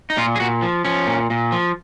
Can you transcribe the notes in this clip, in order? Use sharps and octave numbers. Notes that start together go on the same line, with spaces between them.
D#4
A#2 F4
G#4
A#2 F#4
F3
F3 C#4
A#2
A#2
F3